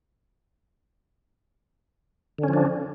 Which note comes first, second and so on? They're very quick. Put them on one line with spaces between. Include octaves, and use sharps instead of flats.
D3 C#4 F3 D4